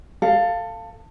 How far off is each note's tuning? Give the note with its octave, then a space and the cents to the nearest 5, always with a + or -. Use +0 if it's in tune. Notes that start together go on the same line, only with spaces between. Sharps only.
A4 +20 F5 +0